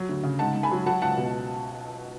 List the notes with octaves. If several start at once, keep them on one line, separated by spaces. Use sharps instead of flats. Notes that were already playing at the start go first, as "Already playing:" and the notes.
Already playing: F#3
D2
C#3
G#2 F#5 A5
G#2
G#5 B5
F#3
F#3 F#5 A5
C#2 F#5 A5
B2